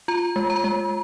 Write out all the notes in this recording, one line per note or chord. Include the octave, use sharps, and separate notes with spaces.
F4 A#5
G#3
A#5
G#3